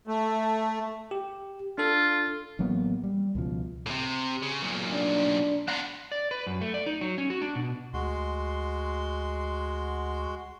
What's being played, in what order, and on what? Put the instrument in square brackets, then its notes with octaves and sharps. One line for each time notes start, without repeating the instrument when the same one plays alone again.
[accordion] A3
[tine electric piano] G4
[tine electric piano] D4 A4 [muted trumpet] F4
[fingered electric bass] A1 F#3 A#3 B3
G3
C#2 B2 F3
[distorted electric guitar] A2 C3
C#3
B1 A#2
[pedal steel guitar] D4
[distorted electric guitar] B3 D4 [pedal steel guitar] F#5 A#5 C6
[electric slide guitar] D5
B4
F#2
A3
D5
D#4
F#3
C#4
F#4
D4
B2
[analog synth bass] D2 [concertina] G#3 F#4 C6